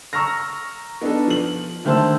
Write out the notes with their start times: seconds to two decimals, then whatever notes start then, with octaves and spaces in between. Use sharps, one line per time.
0.13 A#5 C#6 E6 F6 A#6
1.01 B3 D4 D#4 A4
1.27 F3 F#7
1.85 D3 D#3 A3 C5 A5 E6